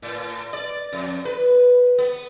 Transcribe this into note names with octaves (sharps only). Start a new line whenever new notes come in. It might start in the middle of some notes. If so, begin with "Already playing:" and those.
A2
D5
F2
B4
B3